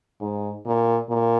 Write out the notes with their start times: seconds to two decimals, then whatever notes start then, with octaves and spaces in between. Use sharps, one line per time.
0.21 G#2
0.66 A#2
1.09 A#2